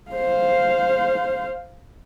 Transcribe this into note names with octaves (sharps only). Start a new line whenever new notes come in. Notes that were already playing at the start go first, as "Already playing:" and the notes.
C5 F5